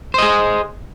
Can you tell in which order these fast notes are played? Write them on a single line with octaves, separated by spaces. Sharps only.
C5 D#5 G#4